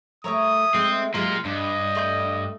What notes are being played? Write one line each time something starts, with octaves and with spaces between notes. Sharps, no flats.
G3 A3 A#4 C#5 E5 D#6
G#3 A3 C4
F#3 G#3 A#3 F4 G4 C6
G2 D4 D#5
A3 C6 G6